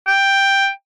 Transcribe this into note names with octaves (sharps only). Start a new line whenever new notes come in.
G5